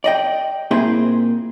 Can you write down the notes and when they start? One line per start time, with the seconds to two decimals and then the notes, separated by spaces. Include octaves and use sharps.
0.04 D5 D#5 G5
0.71 A#2 C4 E4 G#4 C5